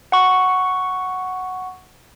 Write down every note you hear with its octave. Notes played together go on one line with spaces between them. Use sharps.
F#5 C#6